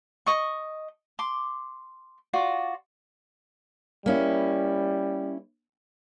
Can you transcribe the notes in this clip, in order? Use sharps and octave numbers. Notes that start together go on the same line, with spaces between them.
D#5 C#6
C6 D6
F4 F#4 D5
G3 A#3 C#4 E4